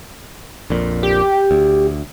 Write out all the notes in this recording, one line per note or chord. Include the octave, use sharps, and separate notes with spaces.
A#1 F2 A#2
G4
D2